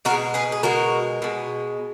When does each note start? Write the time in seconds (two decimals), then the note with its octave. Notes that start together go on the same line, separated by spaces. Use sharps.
0.05 B2 F#4 A#4
0.10 G#3
0.34 G#4 B4
0.52 G#4
0.63 B2 G#3 F#4 A#4
1.22 B2 G#3